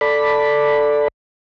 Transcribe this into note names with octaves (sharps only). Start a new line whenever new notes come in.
A4 D5 B5